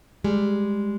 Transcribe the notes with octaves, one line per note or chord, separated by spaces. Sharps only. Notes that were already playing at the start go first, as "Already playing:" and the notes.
G3 G#3